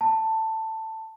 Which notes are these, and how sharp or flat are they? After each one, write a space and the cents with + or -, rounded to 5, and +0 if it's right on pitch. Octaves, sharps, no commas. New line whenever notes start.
A5 +15